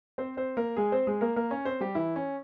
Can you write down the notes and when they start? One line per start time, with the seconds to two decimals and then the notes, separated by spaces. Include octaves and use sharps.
0.18 C4 C5
0.37 C4 C5
0.57 A#3 A#4
0.77 G#3 G#4
0.92 C4 C5
1.07 G#3 G#4
1.21 A#3 A#4
1.36 A#3 A#4
1.51 C#4 C#5
1.65 C4 C5
1.81 G3 G4
1.95 E3 E4
2.16 C#4